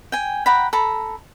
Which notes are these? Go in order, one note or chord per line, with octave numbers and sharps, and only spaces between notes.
G5 G#5
F#5 G5 A#5 B5
A4 A#5 B5